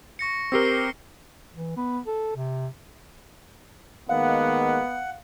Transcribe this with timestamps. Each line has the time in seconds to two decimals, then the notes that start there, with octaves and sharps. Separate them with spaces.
0.19 C#6 A#6 C#7
0.52 C4 G4 A#4 E6 C7 G7
0.65 C7
1.54 E3
1.77 B3
2.07 A4
2.36 C3
4.09 D#3 G#3 A#3 B3 F5 F#5